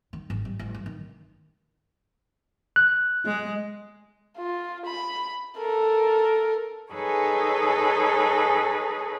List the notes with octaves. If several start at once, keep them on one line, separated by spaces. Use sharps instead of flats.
D#3
G#1
G3
A1
G2
D#3
F#6
G#3
F4
B5
A4 A#4
D#4 G#4 A4 B4 C#5 G#5